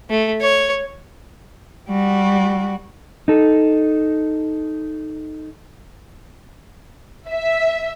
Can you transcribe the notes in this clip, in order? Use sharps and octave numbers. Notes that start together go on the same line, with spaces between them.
A3
C#5
G3 F#4
D#4 A4
E5